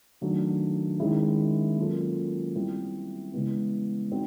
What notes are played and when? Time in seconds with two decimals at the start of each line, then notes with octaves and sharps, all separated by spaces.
0.21 D#3 F#3 A3 D4
1.00 D#3 G#3 C#4 E4 G#4
1.78 F#3 A#3 C#4 F4 A4
2.55 G3 C4 E4
3.33 C#3 E3 G#3 B3
4.11 C4 D#4 F#4